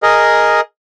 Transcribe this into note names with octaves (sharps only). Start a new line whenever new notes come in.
G#4 A#4 D#5